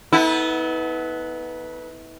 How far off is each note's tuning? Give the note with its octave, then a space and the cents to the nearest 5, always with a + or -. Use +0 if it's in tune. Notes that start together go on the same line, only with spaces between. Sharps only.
B3 +0 E4 -45 A4 +0